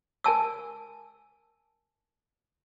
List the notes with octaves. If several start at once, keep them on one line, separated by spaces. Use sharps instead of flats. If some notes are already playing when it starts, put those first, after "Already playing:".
A#4 G#5 A5 E6